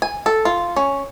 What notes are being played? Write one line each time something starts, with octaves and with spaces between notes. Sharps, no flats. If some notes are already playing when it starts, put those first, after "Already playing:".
G#5
A4
F4
C#4